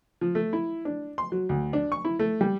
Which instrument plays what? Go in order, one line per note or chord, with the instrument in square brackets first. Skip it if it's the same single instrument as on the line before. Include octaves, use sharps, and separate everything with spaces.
[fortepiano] F3
A3
E4
D4
C6
F#3
D2
D4
C#6
E4
A3
G3